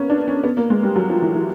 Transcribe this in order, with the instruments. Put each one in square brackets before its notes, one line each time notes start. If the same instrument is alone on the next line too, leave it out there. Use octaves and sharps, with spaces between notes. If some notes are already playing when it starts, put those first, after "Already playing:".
Already playing: [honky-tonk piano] A#3 B3 C#4
D4
C#4
B3
A#3
G#3
G3
F#3
F3
E3
E3